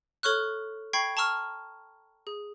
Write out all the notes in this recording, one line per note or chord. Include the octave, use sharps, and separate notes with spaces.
A4 C#5 C#6 F6 F#6
G5 B5 C#6 G#6 C7
A5 A#5 C#6 E6 F6
G#4